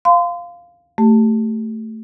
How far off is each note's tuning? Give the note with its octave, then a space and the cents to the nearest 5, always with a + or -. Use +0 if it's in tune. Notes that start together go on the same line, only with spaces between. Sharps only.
F5 +0 C6 -35
A3 +10 G4 +0